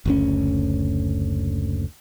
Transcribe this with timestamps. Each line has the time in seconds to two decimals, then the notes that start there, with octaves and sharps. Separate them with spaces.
0.06 F#1 D2 C#4